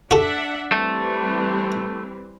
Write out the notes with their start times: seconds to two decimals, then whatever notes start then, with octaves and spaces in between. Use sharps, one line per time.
0.11 D4 F#4 A4 E5 F#5
0.72 E3 G3 A3 C4